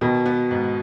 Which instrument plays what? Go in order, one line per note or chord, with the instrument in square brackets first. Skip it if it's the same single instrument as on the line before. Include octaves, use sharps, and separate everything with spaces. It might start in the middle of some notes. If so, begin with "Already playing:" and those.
[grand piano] B2 [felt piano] D#3
[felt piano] B3
G#2